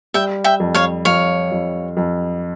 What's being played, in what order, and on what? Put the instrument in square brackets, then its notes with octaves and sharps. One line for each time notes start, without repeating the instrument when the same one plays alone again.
[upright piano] G3 [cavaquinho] E5 G5
[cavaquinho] E5 G5
[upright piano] F2
[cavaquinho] C#5 F5
[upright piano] F2 [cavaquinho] C#5 F5
[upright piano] F2
F2